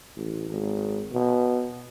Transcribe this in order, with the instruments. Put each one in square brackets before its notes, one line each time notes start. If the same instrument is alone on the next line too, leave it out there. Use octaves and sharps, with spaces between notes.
[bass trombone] A1
G#1
B2